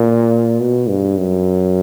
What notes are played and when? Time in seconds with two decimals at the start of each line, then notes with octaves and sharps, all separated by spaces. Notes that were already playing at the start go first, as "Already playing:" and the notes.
Already playing: A#2
0.61 B2
0.89 G2
1.18 F#2